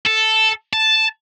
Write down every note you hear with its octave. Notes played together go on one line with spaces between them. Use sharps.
A4
A5